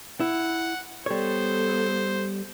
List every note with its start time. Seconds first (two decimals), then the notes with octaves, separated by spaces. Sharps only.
0.20 E4 F#5
1.06 G3 B3 A4 C5 C#5